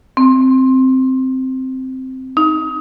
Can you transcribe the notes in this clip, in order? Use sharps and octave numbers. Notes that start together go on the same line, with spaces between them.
C4
D#4